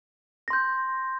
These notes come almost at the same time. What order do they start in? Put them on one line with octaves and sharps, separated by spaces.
A#6 C6 G6